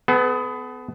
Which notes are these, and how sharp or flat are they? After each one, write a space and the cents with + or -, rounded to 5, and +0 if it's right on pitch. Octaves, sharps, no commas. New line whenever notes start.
B3 +25 A4 -40